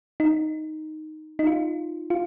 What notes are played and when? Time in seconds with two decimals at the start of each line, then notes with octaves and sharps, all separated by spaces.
0.20 D#4
1.39 D#4
1.47 F4
2.10 F4